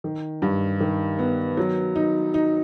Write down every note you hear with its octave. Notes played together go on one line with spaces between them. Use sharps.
D#3
G2
D#3
B3
F#3
D#4
D#4